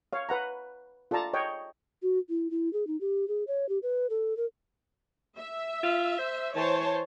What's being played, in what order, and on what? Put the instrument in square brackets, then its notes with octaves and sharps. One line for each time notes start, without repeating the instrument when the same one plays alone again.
[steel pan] C#5 F5
B4 F#5 A#5
F4 A4 D5 A5 A#5
C#5 D#5 G5
[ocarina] F#4
E4
E4
G#4
D#4
G4
G#4
C#5
G4
B4
A4
A#4
[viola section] E5
[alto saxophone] F4
C5
[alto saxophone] E3 [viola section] C5 C#5 A5